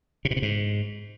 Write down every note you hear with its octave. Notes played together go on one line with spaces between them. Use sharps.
C3
B2
C3
G#2